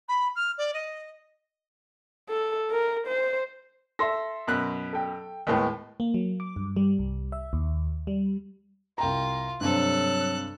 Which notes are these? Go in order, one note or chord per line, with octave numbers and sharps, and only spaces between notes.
B5
F6
D5
D#5
A4
A#4
C5
A4 E5 C6 A#6
F#2 B2 F#6
A4 G5
D#2 A2 G#3 A#3 B3
A#3
F#3
D6
G2
G3
C2
E5
D#2
G3
C2 F4 G5 A#5
G2 C3 F#3 A4 C5 F#6